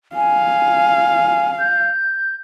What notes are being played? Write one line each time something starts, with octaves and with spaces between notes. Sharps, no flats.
F5 G#5
G6